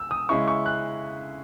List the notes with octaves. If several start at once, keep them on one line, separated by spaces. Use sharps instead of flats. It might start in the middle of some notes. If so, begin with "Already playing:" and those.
Already playing: E6
D#6
C#3 G#3 C#4 E4 C#6
C#6
F#6